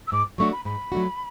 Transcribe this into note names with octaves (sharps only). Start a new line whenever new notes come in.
E6
G#2 D6
F#3 A3 D4 F#4 C#6
B5
G#2 B5
F#3 A3 D4 F#4